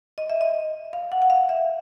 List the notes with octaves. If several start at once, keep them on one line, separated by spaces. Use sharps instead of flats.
D#5
E5
D#5
F5
F#5
F#5
F5
E5